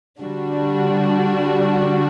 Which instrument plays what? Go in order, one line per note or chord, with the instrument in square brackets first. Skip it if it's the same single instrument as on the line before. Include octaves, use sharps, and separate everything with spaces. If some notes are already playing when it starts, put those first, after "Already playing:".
[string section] D3 G3 D4 F#4